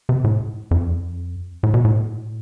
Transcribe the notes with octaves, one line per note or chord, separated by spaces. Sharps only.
C3
A2
F2
A2
B2
A2